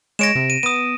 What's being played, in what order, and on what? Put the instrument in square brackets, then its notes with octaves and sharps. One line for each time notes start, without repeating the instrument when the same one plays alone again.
[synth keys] G#3 C#5 [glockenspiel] A#6 D7 E7
[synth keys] C3
[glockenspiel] D#7
[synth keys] B3 [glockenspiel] D#6 D#7